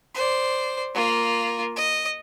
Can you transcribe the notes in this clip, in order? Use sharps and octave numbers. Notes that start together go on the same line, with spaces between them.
C5 D5
A#3 F4
D#5